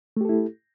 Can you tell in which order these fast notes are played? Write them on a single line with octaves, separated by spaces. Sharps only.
A3 G4 A4 E4